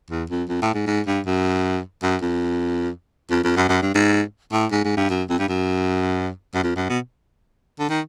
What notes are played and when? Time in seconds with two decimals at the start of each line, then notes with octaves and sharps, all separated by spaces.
0.10 E2
0.30 F2
0.49 F2
0.62 A2
0.74 G#2
0.87 G#2
1.07 G2
1.26 F#2
2.03 F#2
2.22 F2
3.30 F2
3.44 F2
3.56 F#2
3.69 F#2
3.82 G2
3.95 G#2
4.52 A2
4.71 G#2
4.84 G#2
4.97 G2
5.10 F#2
5.29 F2
5.39 G2
5.48 F#2
6.54 F#2
6.63 F2
6.76 F#2
6.89 B2
7.79 D3
7.90 D#3